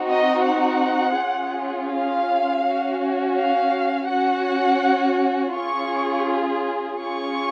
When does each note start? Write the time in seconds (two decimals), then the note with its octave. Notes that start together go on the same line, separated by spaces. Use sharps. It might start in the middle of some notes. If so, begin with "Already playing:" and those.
Already playing: C4 D#4 F#4
0.09 D#5
0.45 F#5
1.18 C#4 F4 G#4
1.91 F5
2.64 C#4 F#4
3.37 F5
4.08 C#4 F#4 F#5
5.55 C#4 F4 G#4 C#6
6.99 C#4 F4 G#4 C#6